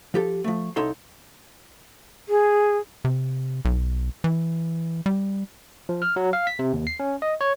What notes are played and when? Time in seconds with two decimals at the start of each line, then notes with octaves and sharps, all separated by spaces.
0.14 F3 G4 A4
0.44 F3 A3
0.76 C2 D#4 A4 C#5 C6
2.29 G#4
3.05 C3
3.65 B1
4.24 E3
5.06 G3
5.89 F3
6.02 F6
6.16 F#3
6.33 F5
6.47 B6
6.59 C3
6.73 D#2
6.87 C7
7.00 C#4
7.22 D#5
7.41 C#5